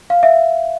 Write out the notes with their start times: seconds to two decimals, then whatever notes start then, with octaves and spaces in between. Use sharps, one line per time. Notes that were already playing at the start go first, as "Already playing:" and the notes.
0.10 F5
0.23 E5